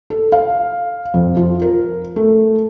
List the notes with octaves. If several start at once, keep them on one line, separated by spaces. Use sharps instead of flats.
A4
F5
F2
F3
A#4
A3